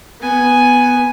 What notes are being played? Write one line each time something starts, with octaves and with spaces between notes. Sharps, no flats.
B3 G#5